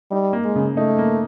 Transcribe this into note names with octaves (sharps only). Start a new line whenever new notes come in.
G3 D#4
A#3
G#3
C#3
A3 D#4
A#3